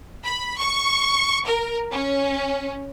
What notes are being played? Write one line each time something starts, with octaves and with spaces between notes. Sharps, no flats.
B5
C#6
A#4
C#4